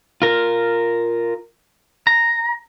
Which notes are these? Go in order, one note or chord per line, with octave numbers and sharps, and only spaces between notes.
F4 A#4
A#5